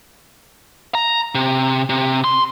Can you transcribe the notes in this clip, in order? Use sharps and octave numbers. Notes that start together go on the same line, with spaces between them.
A#5
C3
C3
C6